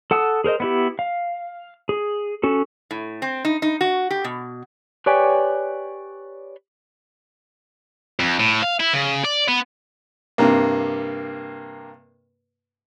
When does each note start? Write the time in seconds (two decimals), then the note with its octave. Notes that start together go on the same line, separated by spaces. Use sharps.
0.11 A4 F#5 A5 D#6 E6
0.44 G#4 A#4 C5 D#5
0.60 B3 E4 G4
0.99 F5
1.89 G#4
2.43 C#4 F#4 A4
2.91 A2
3.22 C4
3.45 D#4
3.62 D#4
3.81 F#4
4.11 G4
4.24 B2
5.06 G4 B4 C#5 D5 G5 G#5
8.19 F2
8.39 A2
8.63 F5
8.80 E4
8.93 C#3
9.24 D5
9.48 B3
10.38 G2 C3 A#3